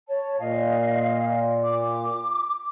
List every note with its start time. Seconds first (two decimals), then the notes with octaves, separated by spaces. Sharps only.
0.08 C#5 A5
0.40 A#2 D#5 F5
1.64 D6